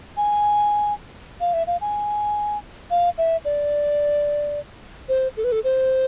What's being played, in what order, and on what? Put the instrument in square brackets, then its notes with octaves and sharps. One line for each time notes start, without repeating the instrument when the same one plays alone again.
[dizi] G#5
F5
E5
F5
G#5
F5
E5
D5
C5
A4
B4
A4
C5